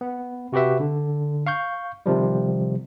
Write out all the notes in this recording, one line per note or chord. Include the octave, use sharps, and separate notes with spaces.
B3
C3 F#4 G4 B4 E5
D3
F5 C#6 G6
C3 D#3 F3 G3